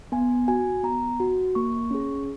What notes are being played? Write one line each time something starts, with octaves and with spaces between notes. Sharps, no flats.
B3 G#5
F#4 G#5
B3 A#5
F#4
A#3 C#6
C#4 G#4